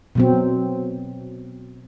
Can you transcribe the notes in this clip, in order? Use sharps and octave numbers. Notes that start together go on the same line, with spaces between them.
B2 F#3 C4